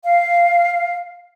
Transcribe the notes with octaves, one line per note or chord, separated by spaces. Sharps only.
F5